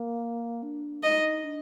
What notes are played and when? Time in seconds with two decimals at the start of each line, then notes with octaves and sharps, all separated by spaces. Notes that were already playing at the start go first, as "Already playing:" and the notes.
Already playing: A#3
0.62 D4
1.03 D#4 D#5
1.44 D4